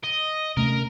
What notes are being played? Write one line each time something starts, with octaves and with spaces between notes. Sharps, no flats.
D#5
C3 A3 C#4 A#4